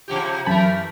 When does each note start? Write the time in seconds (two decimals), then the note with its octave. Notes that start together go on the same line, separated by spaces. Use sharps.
0.08 C3 F3 G4
0.46 F#2 E3 A3 A#4 A5 B5